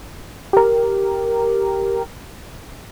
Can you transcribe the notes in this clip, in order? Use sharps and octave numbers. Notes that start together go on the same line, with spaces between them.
G4 A#4